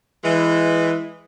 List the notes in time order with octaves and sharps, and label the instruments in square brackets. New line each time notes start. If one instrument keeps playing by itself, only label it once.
[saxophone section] E3 G#3